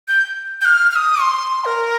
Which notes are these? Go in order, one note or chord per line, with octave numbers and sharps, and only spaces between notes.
G6
G6
F6
F6
D#6
C6
A#4